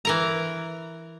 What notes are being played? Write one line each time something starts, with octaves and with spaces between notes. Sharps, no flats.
E3 A#4 A#5